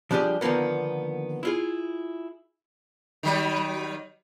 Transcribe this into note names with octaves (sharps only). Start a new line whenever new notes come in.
F3 G3 D4 F4 G4 G#4
D3 D#3 F3 A#3 B3
E4 F4 G#4
D#3 F#3 G3